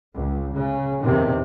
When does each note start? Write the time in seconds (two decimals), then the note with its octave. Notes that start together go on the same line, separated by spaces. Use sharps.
0.15 C#2
0.53 C#3
1.00 E2 C3 D#3